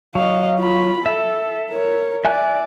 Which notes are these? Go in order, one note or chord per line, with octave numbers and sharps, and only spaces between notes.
F#3 D#5 F5
F4 B5
A4 E5
A#4 C#5
D5 E5 G#5 F#6